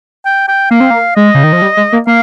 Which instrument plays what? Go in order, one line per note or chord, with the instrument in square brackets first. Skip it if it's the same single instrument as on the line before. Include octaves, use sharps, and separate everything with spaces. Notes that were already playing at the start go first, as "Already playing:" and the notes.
[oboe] G5
G5
[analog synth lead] A#3 [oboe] F5
[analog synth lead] C4
A#3
[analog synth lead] G#3 [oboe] D#5
[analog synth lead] C#3
D#3
F3
G3
G#3
A#3
[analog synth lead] A#3 [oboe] F5